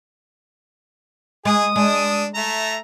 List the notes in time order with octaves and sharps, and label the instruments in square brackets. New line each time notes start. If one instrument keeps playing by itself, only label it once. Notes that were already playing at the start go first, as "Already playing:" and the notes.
[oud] G#3 [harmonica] G#4 [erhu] D#6
[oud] G#3 [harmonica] D4
[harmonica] A3 A#5 [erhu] E5